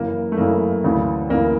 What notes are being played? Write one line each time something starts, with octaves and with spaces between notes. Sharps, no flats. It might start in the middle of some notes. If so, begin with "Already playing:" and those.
Already playing: F#2 C#3 E3 A#3
A3
F#2 C#3 E3 A#3
D2 C#3 E3
D2 C#3 E3 A#3